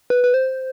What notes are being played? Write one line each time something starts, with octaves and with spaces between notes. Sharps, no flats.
B4
B4
C5